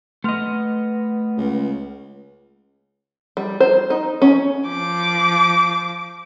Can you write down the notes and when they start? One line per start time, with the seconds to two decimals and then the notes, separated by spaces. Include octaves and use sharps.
0.24 A3 B3 D#5 C6 F6 F7
1.37 C#2
3.37 G3
3.60 C5
3.90 D#4
4.22 C#4
4.68 F3 D6